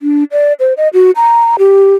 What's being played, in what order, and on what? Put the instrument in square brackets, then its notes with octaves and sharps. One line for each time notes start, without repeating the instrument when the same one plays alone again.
[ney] D4
D5
C5
D#5
F#4
A#5
G4